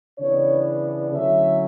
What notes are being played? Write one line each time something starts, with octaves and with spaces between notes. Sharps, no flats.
C#3 E3 B3 D4 C#5
D3 F#3 A3 C#4 E4 E5